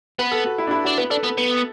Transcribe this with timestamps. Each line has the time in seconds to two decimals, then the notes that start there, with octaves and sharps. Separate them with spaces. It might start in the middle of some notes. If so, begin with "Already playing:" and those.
0.19 B3 B4
0.32 A4
0.46 F#4
0.58 E4
0.67 D4
0.71 E4
0.84 D4 F#4
0.98 B3 B4
1.10 D4 A4
1.23 B3 B4
1.38 B3